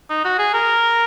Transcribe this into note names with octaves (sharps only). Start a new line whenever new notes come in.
D#4
F#4
G#4
A#4